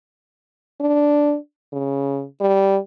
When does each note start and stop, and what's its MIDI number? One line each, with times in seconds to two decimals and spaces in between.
0.81 1.36 62
1.73 2.24 49
2.40 2.78 55